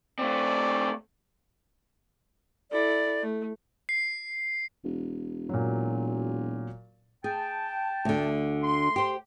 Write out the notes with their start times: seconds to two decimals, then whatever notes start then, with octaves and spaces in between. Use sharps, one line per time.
0.19 A3 C4 D5
2.71 E4 A4 D5
3.22 A3
3.89 C7
4.84 E1
5.49 A#2 F#3
7.24 G#4 G5 A5
8.05 D2 D3
8.63 C6
8.96 G4 C5